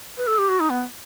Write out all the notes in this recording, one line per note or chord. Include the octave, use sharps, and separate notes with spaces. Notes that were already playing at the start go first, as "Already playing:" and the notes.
B4
A4
G4
F#4
D#4
B3